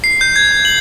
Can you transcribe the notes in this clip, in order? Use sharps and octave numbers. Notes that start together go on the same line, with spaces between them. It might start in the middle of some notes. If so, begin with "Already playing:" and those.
C7
G6
G#6
F#7